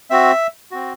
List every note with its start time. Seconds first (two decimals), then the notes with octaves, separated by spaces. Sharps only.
0.10 C4 F#4 E5
0.71 C4 F#4